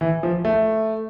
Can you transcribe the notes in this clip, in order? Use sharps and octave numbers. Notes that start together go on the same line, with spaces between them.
E3
F3
A3